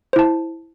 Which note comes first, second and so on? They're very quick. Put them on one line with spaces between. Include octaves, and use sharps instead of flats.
C5 E4 A5